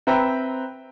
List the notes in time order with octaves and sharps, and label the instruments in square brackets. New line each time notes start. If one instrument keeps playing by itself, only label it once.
[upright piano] C4 B4 E5 G5 A#5